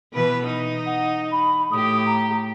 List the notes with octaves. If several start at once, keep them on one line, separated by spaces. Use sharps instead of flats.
B2 E3 B4
D#4
F#5
B5
A2 G4 D#6
A#5